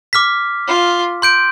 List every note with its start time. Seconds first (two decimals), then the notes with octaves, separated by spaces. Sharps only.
0.13 D6 F6 B6
0.67 F4
1.22 C6 G6 D7